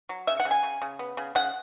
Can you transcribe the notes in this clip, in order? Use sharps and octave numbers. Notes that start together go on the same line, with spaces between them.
F#3
C#3 E5
F#5
C#3
G#5
C#3
C#3
B3
C#3
C#3 F#5